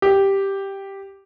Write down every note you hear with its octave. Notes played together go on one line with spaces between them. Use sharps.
G4